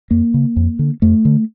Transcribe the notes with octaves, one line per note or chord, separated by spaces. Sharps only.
F2 A#3
C#3
F2
D3
F2 A3
D3